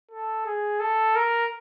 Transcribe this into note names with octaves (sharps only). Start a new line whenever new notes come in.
A4
G#4
A4
A#4